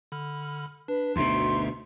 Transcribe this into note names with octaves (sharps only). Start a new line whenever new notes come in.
D3 B5 F6
D4 B4
G1 D2 B2 D#4 E5 C6